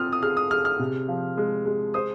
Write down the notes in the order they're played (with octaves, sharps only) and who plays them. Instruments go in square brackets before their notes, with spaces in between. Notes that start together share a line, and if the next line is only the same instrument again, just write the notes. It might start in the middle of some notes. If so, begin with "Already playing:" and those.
Already playing: [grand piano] C4 F4 [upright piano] D#6 F6
[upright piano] D#6
[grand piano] G#4 [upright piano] F6
[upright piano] D#6
[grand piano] G#4 [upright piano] F6
[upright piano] F6
[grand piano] C3
F3
G#3
G#3
[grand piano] C5 [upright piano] D#6